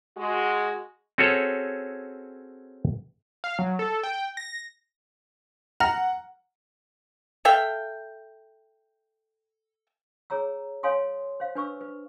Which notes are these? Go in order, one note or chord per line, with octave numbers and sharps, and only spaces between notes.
G#3 F#4
C4 C#4 F#4 G#4 A4 C#5
F5
F#3
A4
G5
A#6
F#5 A#5 F6 A#6
A4 E5 F5 G5
G#4 C#5 A#5 E6
C#5 F5 G#5 C6 D#6
C5 F5
D4 B4 C#6 E6
B4